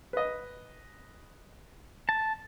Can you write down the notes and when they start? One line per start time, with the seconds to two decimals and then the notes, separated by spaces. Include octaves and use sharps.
0.13 B4 D#5
2.09 A5